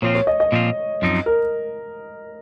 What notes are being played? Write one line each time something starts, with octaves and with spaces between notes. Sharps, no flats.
A#2 F3 C4 F4 C#5
C#5
D#5
D#5
A#2 F3 C4 F4
F#2 F3 C4 D#4
A#4